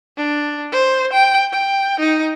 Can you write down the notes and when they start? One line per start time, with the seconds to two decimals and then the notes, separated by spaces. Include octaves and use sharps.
0.17 D4
0.72 C5
1.13 G5
1.53 G5
1.99 D#4